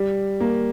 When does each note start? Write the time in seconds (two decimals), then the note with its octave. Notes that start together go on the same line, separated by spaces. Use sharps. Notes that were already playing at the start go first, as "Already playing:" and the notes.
Already playing: G3
0.41 A#3